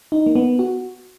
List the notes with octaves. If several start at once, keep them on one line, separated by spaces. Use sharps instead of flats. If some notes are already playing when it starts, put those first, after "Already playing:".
D#4
A#3
B3
F#4